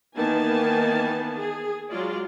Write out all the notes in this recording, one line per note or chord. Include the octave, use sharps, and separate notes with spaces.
D#3 E3 A#3 B3 G#5 A5
G#4
F#3 G#3 F4 D5